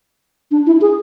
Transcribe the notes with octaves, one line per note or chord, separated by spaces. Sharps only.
D4
E4
G#4